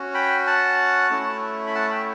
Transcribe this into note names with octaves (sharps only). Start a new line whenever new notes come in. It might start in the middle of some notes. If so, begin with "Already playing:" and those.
Already playing: C#4 F#4
G5 B5
F#5 A5
A3 C#4 E4
B5
F#5 A5
G5 B5